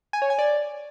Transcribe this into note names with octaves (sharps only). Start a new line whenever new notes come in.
G#5
C#5
G#5
D5